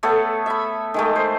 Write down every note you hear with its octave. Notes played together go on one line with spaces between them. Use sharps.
A3 B3 A4 C#5
E5 B5
D#3 G#3 A3
C5